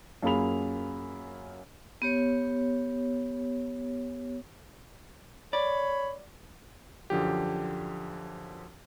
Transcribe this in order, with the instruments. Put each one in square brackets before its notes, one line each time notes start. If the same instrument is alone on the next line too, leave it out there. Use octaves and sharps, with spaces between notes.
[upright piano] F#2 A#3 F4 G#4 B5 F7
[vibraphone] B3 G4 C#5
[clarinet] C#5 [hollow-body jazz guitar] D5 [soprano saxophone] B5
[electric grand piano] F#2 D3 F3 G4